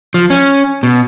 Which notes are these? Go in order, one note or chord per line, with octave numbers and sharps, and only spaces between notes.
F3
C#4
B2